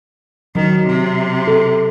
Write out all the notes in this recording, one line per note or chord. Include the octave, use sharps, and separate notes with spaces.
D#3 F#3
C3
A4